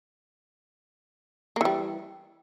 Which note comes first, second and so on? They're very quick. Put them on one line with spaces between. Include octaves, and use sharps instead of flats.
A#3 E3 G3